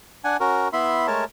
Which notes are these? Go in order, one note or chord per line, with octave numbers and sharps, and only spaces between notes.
D4 F#5 G#5
C#4 F#4 A#4
B3 E4 E5 B5 C6
G#3 A3 A#4 C#5 A5